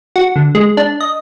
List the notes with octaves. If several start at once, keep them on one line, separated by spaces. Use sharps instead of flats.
F#4
D3
G#3
D4
D#5